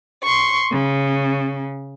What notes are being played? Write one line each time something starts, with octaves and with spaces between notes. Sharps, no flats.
C6 C#6
C#3